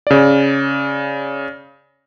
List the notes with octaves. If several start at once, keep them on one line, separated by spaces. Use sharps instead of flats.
C#3 D5